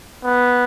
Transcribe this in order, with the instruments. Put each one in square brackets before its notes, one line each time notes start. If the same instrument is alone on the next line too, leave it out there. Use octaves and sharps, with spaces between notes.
[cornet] B3